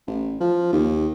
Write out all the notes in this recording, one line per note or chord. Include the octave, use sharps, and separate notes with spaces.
A1
F3
D#2